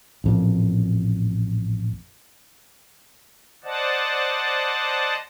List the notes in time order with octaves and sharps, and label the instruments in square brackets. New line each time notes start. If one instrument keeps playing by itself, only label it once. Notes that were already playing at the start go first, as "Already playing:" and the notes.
[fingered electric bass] A1 F2 A#2
[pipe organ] C5 D5 D#5 F#5 A5